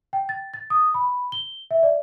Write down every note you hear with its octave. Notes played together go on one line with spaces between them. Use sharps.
G5
A6
A6
D#6
B5
G7
E5
D5